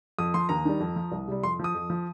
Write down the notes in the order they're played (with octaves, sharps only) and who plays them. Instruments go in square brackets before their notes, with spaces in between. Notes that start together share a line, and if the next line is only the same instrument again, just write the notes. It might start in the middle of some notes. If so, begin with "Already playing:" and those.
[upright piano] F2 D#6
F3 C6
D#2 A#5
D#3 G3
F2
F3
C2
C3 G3
F2 C6
F3 D#6
F2
F3